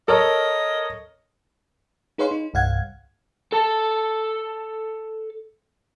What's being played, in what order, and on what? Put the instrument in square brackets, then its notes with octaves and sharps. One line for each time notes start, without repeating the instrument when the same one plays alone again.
[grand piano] A4 A#4 C#5 [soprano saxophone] D#5
[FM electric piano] D#4 G#4 B4 C#5 F5 C6
D#4
C2 G2 F5 F#5 G#6
[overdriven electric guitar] A4 A5